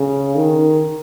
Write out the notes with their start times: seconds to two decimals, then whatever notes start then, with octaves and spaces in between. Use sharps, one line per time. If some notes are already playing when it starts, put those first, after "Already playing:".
Already playing: C#3
0.35 D#3